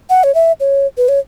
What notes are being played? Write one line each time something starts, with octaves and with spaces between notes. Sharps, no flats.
F#5
C#5
E5
C#5
B4
C#5